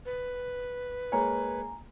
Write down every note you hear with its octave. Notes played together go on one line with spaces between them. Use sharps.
B4
G#3 A#3 C#5 G#5 A#5